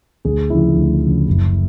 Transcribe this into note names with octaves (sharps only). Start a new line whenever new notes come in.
D2 G#4
C#3 F3 E4
D2
C#3 F3
F#1